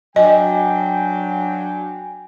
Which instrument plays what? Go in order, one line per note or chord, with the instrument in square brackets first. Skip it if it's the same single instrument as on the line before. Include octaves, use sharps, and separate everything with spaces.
[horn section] F#3 D4 G5 [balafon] D#5 [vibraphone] G#5